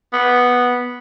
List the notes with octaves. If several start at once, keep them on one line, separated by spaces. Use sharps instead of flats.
B3